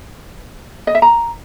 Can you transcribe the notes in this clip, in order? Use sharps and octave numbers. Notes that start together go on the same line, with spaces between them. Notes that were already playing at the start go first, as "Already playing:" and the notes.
D#5
E5
A#5